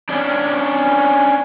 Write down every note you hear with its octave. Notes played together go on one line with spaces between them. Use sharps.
C#4 D4